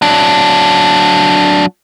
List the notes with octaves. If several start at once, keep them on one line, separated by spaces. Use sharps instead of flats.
F#3 D4